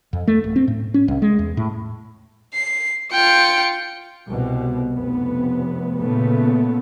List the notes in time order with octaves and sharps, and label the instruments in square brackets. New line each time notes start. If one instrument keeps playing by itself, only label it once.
[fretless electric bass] F2
A3
D1
C4
A2
C#4
C2
G#3
E2
A2
[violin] C7
[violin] F4 C#7 [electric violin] G5
[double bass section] C2 B2
F1 B3
A#2 C#3 A3 B3